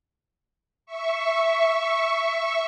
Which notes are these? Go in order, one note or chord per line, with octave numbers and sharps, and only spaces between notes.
E5 C#6